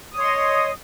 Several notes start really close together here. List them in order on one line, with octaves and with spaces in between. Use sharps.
D#6 C#5 C6 D#5